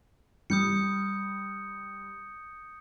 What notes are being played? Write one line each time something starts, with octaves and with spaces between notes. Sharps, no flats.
G3 D#6 G6 C#7